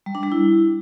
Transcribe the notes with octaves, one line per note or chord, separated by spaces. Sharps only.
G3
D4
G3
E4